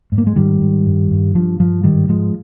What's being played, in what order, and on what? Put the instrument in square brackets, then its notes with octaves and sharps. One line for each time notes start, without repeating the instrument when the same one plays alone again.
[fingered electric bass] G#2
A#3
G#3
G#2 D#3 G3
G#2
G2
G2
G2 F3
G2 F3
G#2 D#3 G3
G#2 F3 G#3